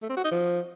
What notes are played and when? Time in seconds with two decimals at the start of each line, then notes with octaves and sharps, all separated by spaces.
0.02 A3
0.10 C4
0.17 F#4
0.24 D#4
0.32 F3